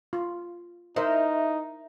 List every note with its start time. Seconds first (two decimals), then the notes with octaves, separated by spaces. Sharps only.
0.13 F4
0.96 D#4 E4 A#4 C5 D#5